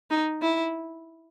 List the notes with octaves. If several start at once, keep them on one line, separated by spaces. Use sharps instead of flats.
D#4
E4